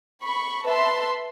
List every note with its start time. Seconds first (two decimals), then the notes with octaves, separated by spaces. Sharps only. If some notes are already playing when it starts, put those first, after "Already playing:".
0.23 B5 C#6
0.65 B4 E5 A5 C6